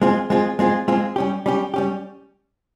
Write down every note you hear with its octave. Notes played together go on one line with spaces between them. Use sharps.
G#3 C4 F4 G#4
G#3 C4 F4 G#4
G#3 C4 F4 G#4
G#3 C4 F4 G#4
G3 C#4 G4
G3 C#4 G4
G3 C#4 G4